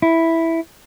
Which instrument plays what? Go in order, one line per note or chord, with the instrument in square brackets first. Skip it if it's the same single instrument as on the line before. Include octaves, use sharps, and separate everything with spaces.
[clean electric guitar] E4